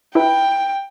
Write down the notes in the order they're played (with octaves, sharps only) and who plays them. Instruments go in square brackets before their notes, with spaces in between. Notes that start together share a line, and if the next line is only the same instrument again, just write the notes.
[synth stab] E4 B4 [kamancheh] G5